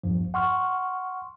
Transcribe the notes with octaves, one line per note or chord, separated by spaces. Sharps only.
A1 E2 G2 F3
F#5 C6 C#6 F6